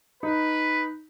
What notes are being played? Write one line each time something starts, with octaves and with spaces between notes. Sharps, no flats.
D#4 B4